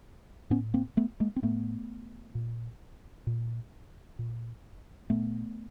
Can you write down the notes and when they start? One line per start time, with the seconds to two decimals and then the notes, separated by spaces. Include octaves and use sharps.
0.50 A2 B3 C#4
0.74 A#3 C4
0.97 A3 B3
1.20 G#3 A#3
1.36 C4
1.42 A2 A3 B3
2.35 A#2
3.27 A#2
4.19 A#2
5.10 A#2 A3 B3